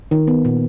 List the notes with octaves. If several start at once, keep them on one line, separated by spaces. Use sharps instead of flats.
D#3
B3
A#2